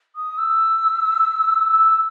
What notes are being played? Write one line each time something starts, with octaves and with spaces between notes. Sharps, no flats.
D#6
E6
E6